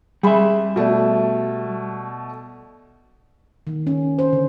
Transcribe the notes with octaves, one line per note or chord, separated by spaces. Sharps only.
G3 G#4 E5 B5
B2 A3 D5
D#3
C#4
C5
D3